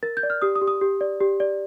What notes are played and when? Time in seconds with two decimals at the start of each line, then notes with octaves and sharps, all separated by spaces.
0.03 A#4 A6
0.17 G6
0.23 D5
0.30 F6
0.42 G4 D#6
0.56 D#6
0.61 G4
0.67 D#6
0.81 G4
1.01 D5
1.21 G4
1.40 D5